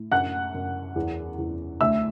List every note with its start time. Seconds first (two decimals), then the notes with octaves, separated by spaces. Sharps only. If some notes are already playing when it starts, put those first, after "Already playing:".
Already playing: A2
0.12 F#2 F#5 F#6
0.55 F#2
0.96 E2
1.38 E2
1.80 D2 E5 E6